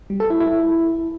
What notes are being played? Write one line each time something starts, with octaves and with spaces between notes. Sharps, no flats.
G3
A4
E4
E4